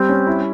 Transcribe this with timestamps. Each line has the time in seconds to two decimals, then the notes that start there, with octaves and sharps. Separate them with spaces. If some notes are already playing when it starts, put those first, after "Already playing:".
Already playing: G3 C4
0.09 C#4
0.27 E4